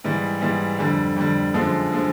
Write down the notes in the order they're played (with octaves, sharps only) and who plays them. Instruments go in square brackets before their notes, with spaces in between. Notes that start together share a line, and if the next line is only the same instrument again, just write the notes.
[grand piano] G#2 E3 G3
G#2 E3 G3
F2 D3 G3
F2 D3 G3
F#2 D3 F3 G#3
D3 F3 G#3